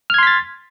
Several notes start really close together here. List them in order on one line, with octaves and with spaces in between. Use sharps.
F6 G#6 C6 B6 A6